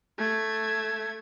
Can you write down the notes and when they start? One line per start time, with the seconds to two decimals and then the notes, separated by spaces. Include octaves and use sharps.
0.18 A3 G#6